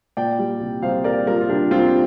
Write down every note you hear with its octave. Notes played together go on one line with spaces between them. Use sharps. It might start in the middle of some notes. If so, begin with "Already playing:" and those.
A#2 D5 G5
G3
C2
C2 C5 F5
A#2 A#4 D5
G3 F4 A#4
F4
C2 D4 G4
C2 C4 F4